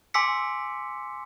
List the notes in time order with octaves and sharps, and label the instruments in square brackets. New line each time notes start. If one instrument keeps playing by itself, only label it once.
[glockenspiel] G#5 C6 D6 E6 B6 C#7